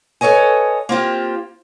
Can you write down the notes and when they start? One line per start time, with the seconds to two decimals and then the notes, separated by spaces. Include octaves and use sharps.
0.21 A4 B4 C#5 D#5 G#5
0.89 A#3 C4 F4 G4